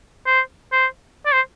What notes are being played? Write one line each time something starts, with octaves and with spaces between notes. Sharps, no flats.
C5
C5
D5
C5